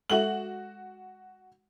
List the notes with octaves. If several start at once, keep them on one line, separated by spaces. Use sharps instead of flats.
G#3 F#4 A4 E5 F#7